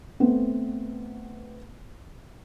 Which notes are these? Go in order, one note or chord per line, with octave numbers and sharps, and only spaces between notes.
A3 B3 C4